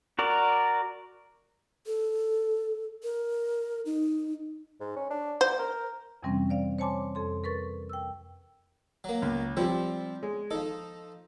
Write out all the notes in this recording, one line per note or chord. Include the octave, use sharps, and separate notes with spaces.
F#4 A#4 D5
A4
A#4
D#4
G#2
C#4
D4
B3 C5
A#4
F2 C3 E3 G3 C4 C#4
C5 D5 F5
C5 C#5 G#5 A5 C6 D6
F2 A4 C6
A#4 B4 C#6 A6
G5 E6
F#3 A#3
C#2
F3 G3 C4 E4 G4
G#3
F3 D#4 A4